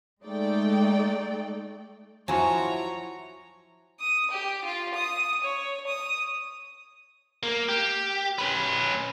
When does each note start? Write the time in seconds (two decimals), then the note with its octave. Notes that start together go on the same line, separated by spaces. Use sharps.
0.23 G#3 A3 D#4 D5 G5
2.28 F3 F#3 E4 F#4 C#5 G#5 A#5
4.00 D#6
4.31 G4
4.64 F4
4.94 D#6
5.44 C#5
5.87 D#6
7.43 A#3
7.69 G4
8.38 C#4 B4